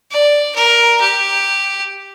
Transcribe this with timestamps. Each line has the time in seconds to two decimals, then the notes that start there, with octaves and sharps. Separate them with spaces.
0.11 D5
0.56 A#4
1.01 G4